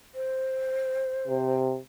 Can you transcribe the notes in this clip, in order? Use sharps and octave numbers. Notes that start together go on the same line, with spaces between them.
C5
C3